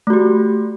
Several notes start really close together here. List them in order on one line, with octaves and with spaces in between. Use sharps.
A3 F#4 G4